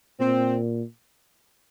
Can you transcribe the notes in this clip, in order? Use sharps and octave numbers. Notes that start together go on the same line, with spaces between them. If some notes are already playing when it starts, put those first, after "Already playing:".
A#2 C4